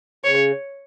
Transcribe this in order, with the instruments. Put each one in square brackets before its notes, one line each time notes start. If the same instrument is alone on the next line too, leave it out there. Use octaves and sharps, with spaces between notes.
[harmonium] C#3 [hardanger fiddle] C#5